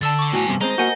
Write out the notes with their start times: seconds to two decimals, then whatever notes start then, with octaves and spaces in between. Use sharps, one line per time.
0.01 D3 A5 E6 A6
0.19 C#6 D6
0.33 A2 B3 F#4 G5 G#5
0.48 G2 C3
0.61 G#3 C4 C5 D#5 A#5
0.78 A#3 F#4 F#5 G#5 G6